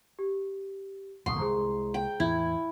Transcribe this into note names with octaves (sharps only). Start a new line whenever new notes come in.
G4
D1 B1 F2 F#5 C6 C#6 D#6
C2 G#3 G#4 C5 A#5
G5
E2 A2 E4 G#6